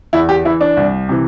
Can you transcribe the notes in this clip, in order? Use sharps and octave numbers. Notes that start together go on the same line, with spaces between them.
E2 E4
G4
E3 E4
D4
C2
C3 E3